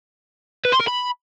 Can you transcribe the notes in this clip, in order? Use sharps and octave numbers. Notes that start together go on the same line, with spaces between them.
B4
C6
A#4
B5